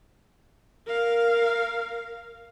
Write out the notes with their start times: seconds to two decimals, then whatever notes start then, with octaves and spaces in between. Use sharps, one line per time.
0.86 A#4 F5